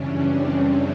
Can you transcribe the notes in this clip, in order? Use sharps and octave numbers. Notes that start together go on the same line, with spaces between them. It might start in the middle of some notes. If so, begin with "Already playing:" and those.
Already playing: F#2 C#3 E3 G3 C#4 D4
C4